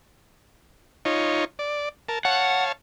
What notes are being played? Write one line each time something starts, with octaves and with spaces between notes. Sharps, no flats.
D#4 F4 C#5
D5
A#4 A5
C#5 F5 F#5 A5